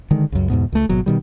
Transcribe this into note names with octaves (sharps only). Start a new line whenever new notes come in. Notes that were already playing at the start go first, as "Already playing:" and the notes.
D3 D#3 G#3
C#2 F#2
E2 G#2 B2
C#2 A3
G#1 B2 F#3
B2 D#3 G3